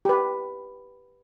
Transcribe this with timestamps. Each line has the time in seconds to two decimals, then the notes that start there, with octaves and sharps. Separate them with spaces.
0.05 G4 B4